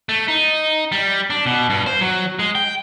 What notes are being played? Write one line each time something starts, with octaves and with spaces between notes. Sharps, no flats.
A3
D#4
G3
D4
B2
G2
C5
F#3
G#3
G5